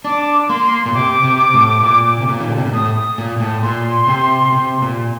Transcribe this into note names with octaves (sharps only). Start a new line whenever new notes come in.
D4 D6
A#3 C6
A#2
C3 D6
C3
A2
A#2
C3
A#2
D#3
D3
C3
A#2
A2 D#6
D#6
A#2
A2
A#2 C6
C3
C3
A#2